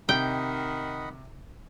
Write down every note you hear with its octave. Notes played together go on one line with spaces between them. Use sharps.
C3 D#3 D#5 F#5 G5 B5